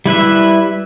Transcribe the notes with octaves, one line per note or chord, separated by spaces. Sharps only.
G3 E4 B4 E5